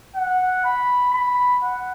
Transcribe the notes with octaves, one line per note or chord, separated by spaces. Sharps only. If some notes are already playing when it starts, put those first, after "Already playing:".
F#5
B5
B5
F#5